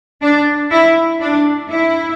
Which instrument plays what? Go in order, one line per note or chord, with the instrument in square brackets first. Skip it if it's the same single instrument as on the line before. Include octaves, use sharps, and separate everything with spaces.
[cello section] D4
E4
D4
E4